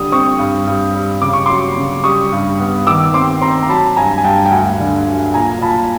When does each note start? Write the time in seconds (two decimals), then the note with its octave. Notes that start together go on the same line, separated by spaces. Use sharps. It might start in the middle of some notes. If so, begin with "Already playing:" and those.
Already playing: D3 G3 D#6
0.12 C4 C#6 D#6
0.39 G2
0.67 G2
0.94 G3
1.21 C#3 D6
1.33 C#6
1.46 F#3 C6 D6
1.77 C#3
2.04 G3 C#6 D#6
2.32 G2
2.60 B3
2.87 D#3 D6 E6
3.14 C4 C6 D6
3.41 C4 A#5 C6
3.63 A#5
3.69 F#3 A5 B5
3.96 G2 G#5 A#5
4.18 G#5
4.24 G2 G5 A5
4.46 G5
4.51 D2 F#5 G#5
4.80 D3
5.06 F#3
5.34 A#2 G#5 A#5
5.61 A#2 A5 B5